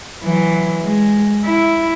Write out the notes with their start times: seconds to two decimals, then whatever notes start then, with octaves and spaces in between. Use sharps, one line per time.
0.23 E3 F#3
0.83 G#3
1.45 E4